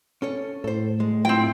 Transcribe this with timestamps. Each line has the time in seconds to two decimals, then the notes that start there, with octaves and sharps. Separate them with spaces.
0.22 C#4 A4 C#5
0.64 A2 A4 C5
1.00 G#3
1.25 F#3 C4 E4 F4 G5